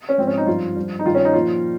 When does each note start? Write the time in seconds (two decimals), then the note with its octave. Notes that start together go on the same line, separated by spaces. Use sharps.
0.09 C#4
0.18 G#2 F3 C4
0.27 C#4
0.38 D#4
0.47 G2 F3 F4
0.76 G2 F3
0.99 D#4
1.05 G2 D#3 F4
1.15 C#4
1.25 D#4
1.34 A#2 F3 F4